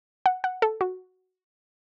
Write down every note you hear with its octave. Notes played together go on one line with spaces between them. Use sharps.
F#5
F#5
A4
F#4